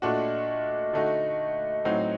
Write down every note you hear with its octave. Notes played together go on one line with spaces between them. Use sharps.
A#2 A3 D4 F#4 D#5
D3 A3 D#4 F#4
A2 F#3 C4 D#4 F#4